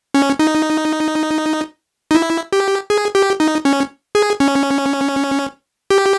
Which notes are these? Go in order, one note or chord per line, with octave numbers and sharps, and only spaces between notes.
C#4
D#4
D#4
E4
G4
G#4
G4
D#4
C#4
G#4
C#4
G4